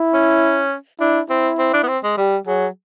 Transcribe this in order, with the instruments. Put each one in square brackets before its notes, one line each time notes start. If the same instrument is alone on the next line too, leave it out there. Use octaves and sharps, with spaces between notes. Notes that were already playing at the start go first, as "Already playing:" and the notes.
Already playing: [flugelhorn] E4
[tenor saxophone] C#4
[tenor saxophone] D4 [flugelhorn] E4
[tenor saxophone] C4 [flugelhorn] E4
[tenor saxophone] C4
D4
B3
C4
G#3
[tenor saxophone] G3 [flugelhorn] G4
[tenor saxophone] F#3 [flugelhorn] G#4